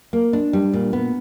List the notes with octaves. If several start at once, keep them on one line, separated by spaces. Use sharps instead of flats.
A#3
D4
G3
A#2
B3